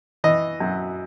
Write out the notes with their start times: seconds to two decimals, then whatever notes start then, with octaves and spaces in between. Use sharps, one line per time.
0.24 E3 D#5
0.60 F#2